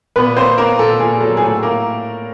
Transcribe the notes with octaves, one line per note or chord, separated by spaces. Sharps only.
A#2 B3 B4
A#3 C4 C5
A#3 A#4
A#2 A4
A#2 G#4
F#3 A4
G#4
A2 A4
A#3 A#4